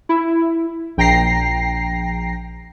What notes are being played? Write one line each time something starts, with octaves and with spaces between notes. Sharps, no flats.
E4
A#1 G5 A#5 A#6 C7